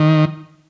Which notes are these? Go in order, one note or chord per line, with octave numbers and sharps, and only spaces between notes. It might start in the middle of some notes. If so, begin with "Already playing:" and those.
Already playing: D#3